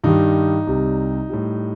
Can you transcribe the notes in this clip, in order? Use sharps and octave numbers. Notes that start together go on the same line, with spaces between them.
G2 D#3 G3 D#4
C2 C3 G3
A2 G3